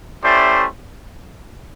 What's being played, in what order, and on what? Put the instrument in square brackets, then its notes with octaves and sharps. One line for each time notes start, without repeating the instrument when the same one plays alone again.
[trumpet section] A3 C#4 E4 G4 C5 D5